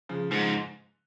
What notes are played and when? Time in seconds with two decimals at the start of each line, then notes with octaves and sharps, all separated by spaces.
0.09 C#3 F3
0.31 G#2 C#3 F3